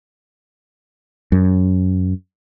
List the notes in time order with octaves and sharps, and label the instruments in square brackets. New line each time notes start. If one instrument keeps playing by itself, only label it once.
[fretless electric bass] F#2